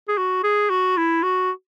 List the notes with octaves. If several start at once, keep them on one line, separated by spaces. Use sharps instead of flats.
G#4
F#4
G#4
F#4
E4
F#4